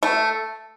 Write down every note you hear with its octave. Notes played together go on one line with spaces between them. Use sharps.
A3